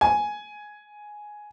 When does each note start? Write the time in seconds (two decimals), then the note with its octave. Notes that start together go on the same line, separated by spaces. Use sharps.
0.01 G#5